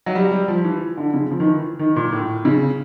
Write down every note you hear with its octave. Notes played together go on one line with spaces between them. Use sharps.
F#3
G3
G3
F3
E3
D3
C#3
F3
D#3
E3
D#3
A#2
A2
C#3